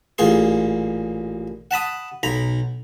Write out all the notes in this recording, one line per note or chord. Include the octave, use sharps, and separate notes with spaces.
A1 A#2 G#4 C6
F#5 A5 B5 D#6
B1 A#5 B5